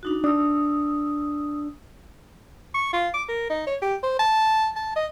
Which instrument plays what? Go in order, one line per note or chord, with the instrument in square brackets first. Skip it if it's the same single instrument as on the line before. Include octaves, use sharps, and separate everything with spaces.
[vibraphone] D4 D#4 F#4
[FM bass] D4 [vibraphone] D#6 E6
[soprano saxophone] C#6
F4
D6
A#4
D#4
C#5
G4
C5
A5
A5
D#5